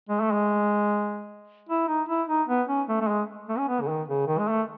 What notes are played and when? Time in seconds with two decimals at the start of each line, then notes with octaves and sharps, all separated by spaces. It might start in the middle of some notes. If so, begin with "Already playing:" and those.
0.09 G#3
0.21 A3
0.32 G#3
1.69 E4
1.88 D#4
2.09 E4
2.28 D#4
2.48 B3
2.68 C#4
2.89 A3
3.01 A3
3.08 G#3
3.49 A3
3.58 C#4
3.68 B3
3.81 C#3
3.88 D#3
4.09 C#3
4.27 D#3
4.38 G#3
4.48 A3